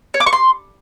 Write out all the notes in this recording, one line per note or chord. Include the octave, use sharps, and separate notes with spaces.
C#5
D6
C#6
C6